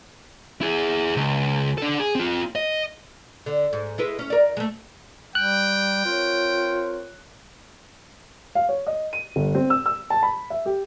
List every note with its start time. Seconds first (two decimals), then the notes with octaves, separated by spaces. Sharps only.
0.61 E4 G#4
1.17 C#2
1.78 D4 A4
2.00 G#4
2.15 C4 F4
2.56 D#5
3.46 D3
3.73 G#2
3.98 G#3 E4 B4
4.19 C#4
4.30 A#4 D5
4.57 G#3 A3
5.35 G3 G5 F#6
6.06 C4 F4 A#4 C#5
8.55 F5
8.69 C#5
8.87 D#5
9.13 D#7
9.36 G1
9.55 C4
9.70 E6
9.86 E6
10.10 A5
10.23 B5
10.50 E5
10.66 G4